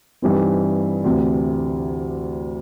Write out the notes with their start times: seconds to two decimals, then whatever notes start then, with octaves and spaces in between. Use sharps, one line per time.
0.22 G2 E3 G3 C4 D#4
1.04 D2 C3 E3